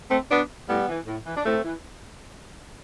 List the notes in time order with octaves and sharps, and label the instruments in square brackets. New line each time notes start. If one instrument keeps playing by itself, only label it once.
[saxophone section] A3 C4
B2 B3 D4
A2 G3 B3
E3
A2
E3
D4
A2 A3 C4
E3